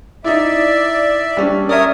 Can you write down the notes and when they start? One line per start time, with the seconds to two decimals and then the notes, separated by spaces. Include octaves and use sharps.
0.24 D#4 E4 D5 E5
1.37 G3 C#4 D4
1.69 A#4 C#5 D5 E5 D#6